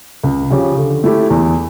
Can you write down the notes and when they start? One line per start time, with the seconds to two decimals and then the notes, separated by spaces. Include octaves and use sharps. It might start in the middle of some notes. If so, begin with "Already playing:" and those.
0.24 C#2
0.50 C#3 F3 C#4 G4
0.77 D3
1.04 A3 E4 G4
1.30 E2